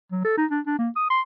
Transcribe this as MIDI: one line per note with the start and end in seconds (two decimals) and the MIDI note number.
0.12 0.21 54
0.24 0.34 69
0.37 0.46 63
0.51 0.60 62
0.66 0.75 62
0.79 0.89 58
0.96 1.09 87
1.10 1.21 84